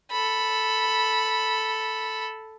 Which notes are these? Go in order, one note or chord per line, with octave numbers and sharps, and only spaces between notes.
A4 B5